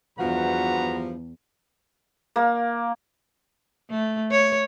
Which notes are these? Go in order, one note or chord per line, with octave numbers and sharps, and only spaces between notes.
E2 G2 F3 F#4 B4 F#5 A#5
A#3
A3
C#5